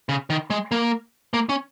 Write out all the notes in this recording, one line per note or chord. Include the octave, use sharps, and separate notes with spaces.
C#3
D#3
G#3
A#3
A#3
C#4